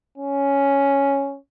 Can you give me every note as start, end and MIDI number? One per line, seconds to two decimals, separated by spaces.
0.18 1.38 61